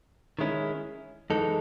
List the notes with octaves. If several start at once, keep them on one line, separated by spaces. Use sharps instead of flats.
D#3 G#3 C#4 E4
F#2 E3 G#3 D#4 A4